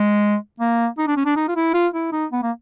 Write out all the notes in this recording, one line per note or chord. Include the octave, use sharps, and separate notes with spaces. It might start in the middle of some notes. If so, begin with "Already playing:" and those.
Already playing: G#3
A#3
D#4
D4
C#4
D4
D#4
F4
E4
F4
E4
D#4
B3
A#3